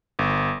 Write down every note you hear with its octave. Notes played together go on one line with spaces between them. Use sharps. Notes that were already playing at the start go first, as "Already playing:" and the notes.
G1